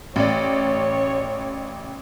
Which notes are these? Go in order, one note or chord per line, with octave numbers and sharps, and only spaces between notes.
A1 C#5 D5